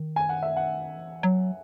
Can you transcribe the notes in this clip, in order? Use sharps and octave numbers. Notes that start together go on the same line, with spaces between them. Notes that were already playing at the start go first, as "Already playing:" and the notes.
Already playing: D#3
G#5
F#5
E5
F#5
E3
F#3